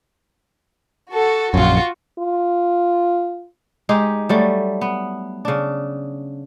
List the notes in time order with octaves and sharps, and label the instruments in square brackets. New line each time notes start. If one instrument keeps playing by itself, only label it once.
[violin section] F#4 A4
[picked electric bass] A#1 F#2 [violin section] F4 F#4
[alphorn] F4
[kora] G#3 D#4 G4
F#3 G3 A3
B3
C#3 D4